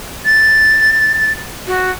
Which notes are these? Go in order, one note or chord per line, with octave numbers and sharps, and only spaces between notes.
A6
F#4